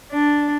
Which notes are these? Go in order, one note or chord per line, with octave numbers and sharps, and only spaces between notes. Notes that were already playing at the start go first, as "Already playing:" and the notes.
D4